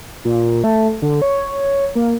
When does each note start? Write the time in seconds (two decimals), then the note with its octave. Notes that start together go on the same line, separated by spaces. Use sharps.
0.25 A#2
0.64 A3
1.02 D3
1.22 C#5
1.95 A#3